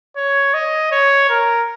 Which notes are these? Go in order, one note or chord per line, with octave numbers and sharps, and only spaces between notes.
C#5
D#5
C#5
A#4